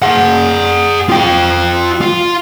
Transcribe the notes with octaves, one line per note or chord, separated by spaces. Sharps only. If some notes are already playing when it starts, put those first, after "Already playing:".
G#4 F#5
F4 G5
F4